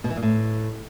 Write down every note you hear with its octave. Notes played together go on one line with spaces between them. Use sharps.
B2
E3
A#2
A2